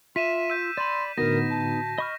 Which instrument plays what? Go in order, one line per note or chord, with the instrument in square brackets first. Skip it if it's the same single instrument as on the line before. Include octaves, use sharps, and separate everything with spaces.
[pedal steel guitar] F4 [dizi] E5 [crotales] B6 D#7 E7
[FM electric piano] E6 [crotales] G6 D#7
[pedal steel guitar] D5 B5 [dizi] C6
[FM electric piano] A2 D3 F#4 [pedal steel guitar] B3 D#4 [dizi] A#4 [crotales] A#6
[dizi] A5
[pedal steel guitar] D#5 C#6 F6 [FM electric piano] B5